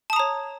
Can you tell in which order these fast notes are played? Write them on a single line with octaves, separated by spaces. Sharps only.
A5 D#6 A#5 C#5